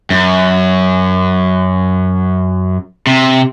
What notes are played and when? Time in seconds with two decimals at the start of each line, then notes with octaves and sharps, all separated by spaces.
0.10 F#2
3.07 C3